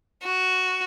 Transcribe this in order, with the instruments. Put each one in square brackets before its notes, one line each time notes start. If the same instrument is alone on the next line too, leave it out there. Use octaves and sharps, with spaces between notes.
[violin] F#4